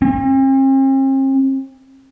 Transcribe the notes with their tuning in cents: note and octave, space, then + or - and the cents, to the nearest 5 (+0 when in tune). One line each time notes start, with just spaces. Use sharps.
C4 +45